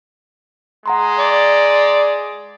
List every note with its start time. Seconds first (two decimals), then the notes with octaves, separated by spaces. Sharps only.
0.86 G#3 F#5 A#5 C6
1.19 D5